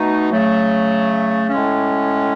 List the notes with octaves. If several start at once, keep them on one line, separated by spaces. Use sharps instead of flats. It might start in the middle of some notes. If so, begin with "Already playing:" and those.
Already playing: B2 A3 D#4
C#3 F#3 A3
A2 G#3 C#4